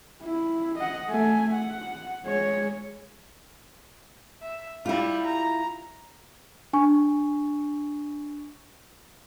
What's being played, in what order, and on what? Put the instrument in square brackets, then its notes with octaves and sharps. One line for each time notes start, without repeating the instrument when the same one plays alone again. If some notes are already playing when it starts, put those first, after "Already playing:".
[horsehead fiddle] E4
D#5 F#5
A3 G#5
F#5
G#3 C#5
[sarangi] E5
[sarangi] G3 [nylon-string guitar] E4 F4
[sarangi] A#5
[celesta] D4 G#5 C#6